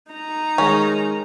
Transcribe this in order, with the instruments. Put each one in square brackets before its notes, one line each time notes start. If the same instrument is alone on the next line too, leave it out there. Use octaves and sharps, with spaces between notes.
[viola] D#4 A#5
[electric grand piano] D#3 G#3 [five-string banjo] C#4